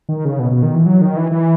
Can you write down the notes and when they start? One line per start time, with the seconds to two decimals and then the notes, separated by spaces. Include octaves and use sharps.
0.09 D#3
0.25 C#3
0.39 B2
0.51 B2
0.63 D#3
0.74 E3
0.86 F#3
1.01 D#3
1.17 E3
1.32 E3